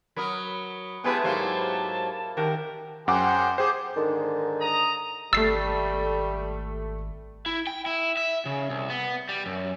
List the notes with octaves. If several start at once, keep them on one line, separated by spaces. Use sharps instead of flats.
F#3 A#4 B5 D#6
G#3 A3 B3 E4 G4 G#4 B4 A5
G#2 F#3 A#3 G4 C5 F#5
D#3 G4 A#4 F#5
F#2 G#4 C5 F#5 G5 D6
G4 G#4 C5 G5 D6
G#2 D3 D#3
A#5 D#6
G#1 G3 A3 E6 A6 C7
E4
G5
E4
E5
C#3
C2
B3
G3
F#2